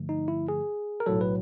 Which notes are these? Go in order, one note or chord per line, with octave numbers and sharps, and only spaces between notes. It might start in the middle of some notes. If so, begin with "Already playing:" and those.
Already playing: G2 D3 F3 A3
D#4
E4
G#4
A#4
B1 A2 F#3 A4
B4